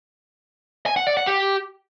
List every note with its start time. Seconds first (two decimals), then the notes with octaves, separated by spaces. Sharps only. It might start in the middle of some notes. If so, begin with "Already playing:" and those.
0.86 G#5
0.96 F#5
1.07 D5
1.17 F#5
1.27 G4